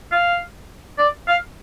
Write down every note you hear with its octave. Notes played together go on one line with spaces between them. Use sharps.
F5
D5
F5